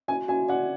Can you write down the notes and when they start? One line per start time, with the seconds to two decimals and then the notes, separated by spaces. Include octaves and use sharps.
0.08 F#4 G#5
0.28 F#4 G#5
0.49 D5 F#5